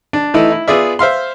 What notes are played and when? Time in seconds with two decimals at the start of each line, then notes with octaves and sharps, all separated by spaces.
0.13 D4
0.34 E3 A3 D#4 E4
0.52 E4
0.68 B3 F4 G#4 D5 E5
0.99 C5 E5 F5 C6